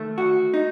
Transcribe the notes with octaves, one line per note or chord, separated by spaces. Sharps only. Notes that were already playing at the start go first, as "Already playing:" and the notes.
Already playing: D#3 A3
F#4
D#4